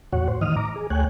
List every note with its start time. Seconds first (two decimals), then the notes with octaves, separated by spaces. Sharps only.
0.13 E2 A2 F#4 C#5 F#5
0.28 C5
0.41 A2 D#3 E3 D#5 D#6 F6
0.56 A#5 D6
0.76 G#4
0.90 D2 A3 C#5 G5 G#5 F#6